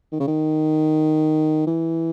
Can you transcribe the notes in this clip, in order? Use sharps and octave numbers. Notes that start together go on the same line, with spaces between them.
D#3
C#3
D#3
E3